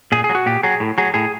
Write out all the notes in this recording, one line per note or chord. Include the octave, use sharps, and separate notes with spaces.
A#2 G#4
G#4
F#3
F#4
A#2 G4
F#3 G#4
A2
F#3 G#4
A2 G#4